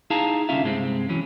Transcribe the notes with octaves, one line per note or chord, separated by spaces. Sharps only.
D#4 E4 G#4 F5 A5 A#5
C2 D3 C#4 F4 E5 F5
G2 C3 G#3 C4
E3 F#3 C#4